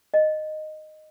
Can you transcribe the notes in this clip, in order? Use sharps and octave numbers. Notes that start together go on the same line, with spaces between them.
D#5